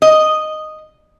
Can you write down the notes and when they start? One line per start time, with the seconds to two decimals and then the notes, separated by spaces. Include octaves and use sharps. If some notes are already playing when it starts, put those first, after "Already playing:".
0.02 D#5